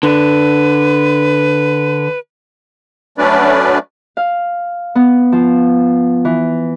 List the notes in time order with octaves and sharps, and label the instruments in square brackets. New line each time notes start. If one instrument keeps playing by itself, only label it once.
[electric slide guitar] D3 [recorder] B4
[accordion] F#3 A3 C#4 D4 B4 D5
[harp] F5
B3
F3
E3